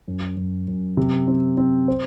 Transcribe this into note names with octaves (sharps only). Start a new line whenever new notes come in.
F#2
F#2
F#2
C3
C4
C4
C5